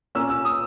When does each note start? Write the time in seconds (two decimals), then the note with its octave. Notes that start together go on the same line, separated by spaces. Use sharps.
0.15 A#2 A#3 C#4 E6
0.30 E6
0.45 D#6